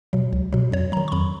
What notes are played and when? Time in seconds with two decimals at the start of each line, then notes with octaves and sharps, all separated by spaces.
0.13 B2 F#3
0.33 C#2
0.53 B2 F#3
0.72 F2 C#5
0.92 F#3 A#5
0.97 D#3
1.08 C#6
1.12 F2 B5